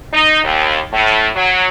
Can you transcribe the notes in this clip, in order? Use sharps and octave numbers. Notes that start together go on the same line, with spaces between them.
D#4
D#2
A2
F#3